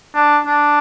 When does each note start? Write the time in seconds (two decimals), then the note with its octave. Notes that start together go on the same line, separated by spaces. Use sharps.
0.15 D4
0.46 D4